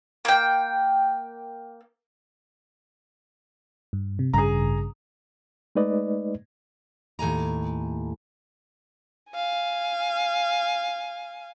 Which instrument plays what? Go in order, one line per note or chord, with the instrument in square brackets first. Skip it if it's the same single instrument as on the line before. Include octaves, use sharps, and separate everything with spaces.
[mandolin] A#3 G5
[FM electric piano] G2
C3
[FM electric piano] A1 G2 C#3 [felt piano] G#4 A#5
[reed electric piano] G#3 A3 D#4 B4 D5 D#5
[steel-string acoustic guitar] D#2 A2 G#5 A#5
[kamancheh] F5 G#5